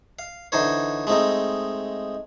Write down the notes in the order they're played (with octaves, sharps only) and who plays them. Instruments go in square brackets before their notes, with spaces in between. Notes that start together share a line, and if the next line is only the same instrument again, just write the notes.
[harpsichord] F5
D3 E3 D#4 C5 C#5
G#3 A3 C4 D#4